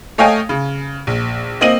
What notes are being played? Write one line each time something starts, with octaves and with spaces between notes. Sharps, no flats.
A3 C#5 D#5 F5 G5 G#5
C#3
A#1
A#3 C4 D#5 F5 D#7 F#7